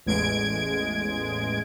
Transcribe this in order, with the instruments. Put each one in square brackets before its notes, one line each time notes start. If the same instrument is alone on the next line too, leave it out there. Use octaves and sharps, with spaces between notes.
[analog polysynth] A1 E2 G#3 G#6 D7